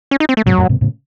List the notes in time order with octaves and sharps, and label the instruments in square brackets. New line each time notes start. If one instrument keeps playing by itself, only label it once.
[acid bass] C#4
D#4
C4
A3
[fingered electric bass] G#2 C3 [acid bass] F#3
[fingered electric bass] F#2 A2
G#2 C3
A2 C#3